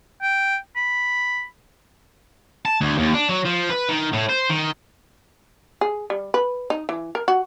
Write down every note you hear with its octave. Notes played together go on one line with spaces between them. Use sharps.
G5
B5
A5
D2
D#2
D4
F#3
F3
B4
D#3
A2
C5
D#3
G#4
G3
B4
D#4
E3
A#4
F#4